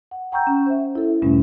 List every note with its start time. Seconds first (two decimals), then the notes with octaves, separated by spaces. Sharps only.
0.11 F#5
0.32 F#5 G5 A#5 C#6 E6 G6
0.47 C#4
0.66 C5 E5
0.95 E4 A4 E5
1.22 E2 G2 B2 G3 A3 C#4